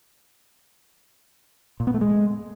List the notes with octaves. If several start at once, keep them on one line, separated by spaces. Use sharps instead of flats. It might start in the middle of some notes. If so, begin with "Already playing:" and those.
A#2
B3
A3
G#3